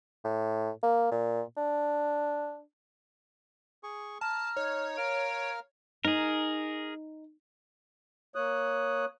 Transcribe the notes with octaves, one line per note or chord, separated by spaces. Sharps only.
A2
A#3
A#2
D4
G#4 C#6
A5 A#5 F6
D#4 C#5
A#4 F5 F6 D7
D#4 G#4 A#4
A#3 C#5 D#6 F#6